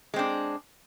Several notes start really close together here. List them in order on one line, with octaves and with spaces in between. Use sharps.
G#3 C4 D4